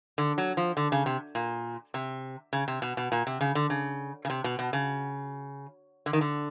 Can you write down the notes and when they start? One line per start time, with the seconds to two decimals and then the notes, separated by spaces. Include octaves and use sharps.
0.18 D3
0.38 F#3
0.57 F3
0.77 D3
0.92 C#3
1.06 C3
1.35 A#2
1.94 C3
2.53 C#3
2.68 C3
2.82 B2
2.97 B2
3.12 A#2
3.27 C3
3.41 C#3
3.55 D3
3.70 C#3
4.25 C#3
4.30 C3
4.44 B2
4.59 B2
4.73 C#3
6.06 D3
6.13 D#3
6.21 D3